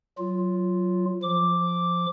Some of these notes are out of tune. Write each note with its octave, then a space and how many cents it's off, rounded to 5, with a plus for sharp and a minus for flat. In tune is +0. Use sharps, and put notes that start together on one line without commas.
F#3 +0 F4 +0
F3 +0 D6 +0